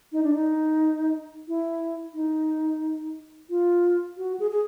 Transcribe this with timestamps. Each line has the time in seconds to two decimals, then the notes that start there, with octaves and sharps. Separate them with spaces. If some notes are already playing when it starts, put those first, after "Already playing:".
0.12 D#4
0.23 D4
0.34 D#4
1.48 E4
2.14 D#4
3.49 F4
4.17 F#4
4.40 G#4
4.51 G#4